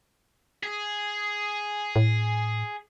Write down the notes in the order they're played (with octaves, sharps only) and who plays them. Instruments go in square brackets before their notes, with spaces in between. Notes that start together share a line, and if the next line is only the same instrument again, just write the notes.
[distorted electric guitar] G#4
[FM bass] A2